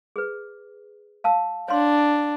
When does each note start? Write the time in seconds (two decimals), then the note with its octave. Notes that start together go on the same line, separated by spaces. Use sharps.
0.16 G#4 B4
1.24 F5 A5 E6
1.68 D4 C#5 F5 C6